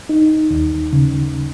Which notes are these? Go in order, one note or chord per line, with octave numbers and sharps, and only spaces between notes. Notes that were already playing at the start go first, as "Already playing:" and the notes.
D#4
D#2
C#3